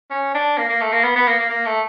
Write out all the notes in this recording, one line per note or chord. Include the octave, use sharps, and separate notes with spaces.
C#4
D4
A#3
A#3
A3
A#3
B3
B3
A#3
A#3
A#3
A3